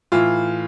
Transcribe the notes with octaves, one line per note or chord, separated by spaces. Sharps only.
A2 E3 F4